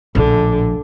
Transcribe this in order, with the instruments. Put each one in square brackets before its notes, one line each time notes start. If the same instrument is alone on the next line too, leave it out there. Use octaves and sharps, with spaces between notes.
[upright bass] A#1 A2 [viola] D3